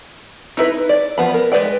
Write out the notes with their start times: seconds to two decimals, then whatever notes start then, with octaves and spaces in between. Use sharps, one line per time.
0.57 D#4 E4 B4
0.89 D5
1.18 F3 B3 B5
1.34 A#4
1.52 G#3 A#4 B4 D5 G5